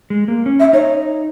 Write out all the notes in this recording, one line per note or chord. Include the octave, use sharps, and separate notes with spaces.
G#3
A#3
C#4
E5
D#4 C#5